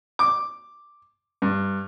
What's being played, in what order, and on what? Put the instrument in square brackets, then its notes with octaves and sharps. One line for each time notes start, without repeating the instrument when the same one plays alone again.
[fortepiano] D6
G2